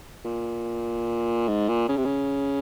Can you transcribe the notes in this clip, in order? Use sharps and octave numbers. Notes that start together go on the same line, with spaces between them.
A#2
G#2
A#2
C#3
C3
C#3